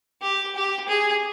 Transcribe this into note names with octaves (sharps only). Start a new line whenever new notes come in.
G4
G4
G#4